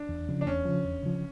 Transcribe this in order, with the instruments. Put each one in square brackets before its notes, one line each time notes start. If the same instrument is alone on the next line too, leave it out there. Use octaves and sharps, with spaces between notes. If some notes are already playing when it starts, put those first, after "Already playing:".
Already playing: [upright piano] D4
[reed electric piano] E2
C#3 F3
[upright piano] D4
[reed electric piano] E2 [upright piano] C#4
[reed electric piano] C#3 F3
E2
C#3 F3